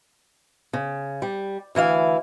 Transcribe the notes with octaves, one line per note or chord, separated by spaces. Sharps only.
C#3
G3
D2 E3 E4 F5